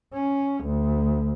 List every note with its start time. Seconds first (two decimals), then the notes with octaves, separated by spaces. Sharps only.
0.14 C#4
0.65 D2